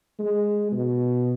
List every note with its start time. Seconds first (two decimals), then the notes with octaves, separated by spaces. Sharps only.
0.19 G#3
0.72 B2